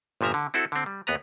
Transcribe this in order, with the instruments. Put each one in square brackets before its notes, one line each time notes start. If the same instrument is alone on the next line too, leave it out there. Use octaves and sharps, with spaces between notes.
[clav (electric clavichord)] G1 A#2 F3 E5 A#5
D3
C4 E4 F#4 A4
D3 C4
G3
D#2 B3 B4 A#5